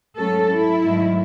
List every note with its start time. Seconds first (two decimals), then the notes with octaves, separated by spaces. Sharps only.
0.18 G#2 F#3 A3 C#4 A4
0.50 E4
0.82 G#2 D#3 F#3 A3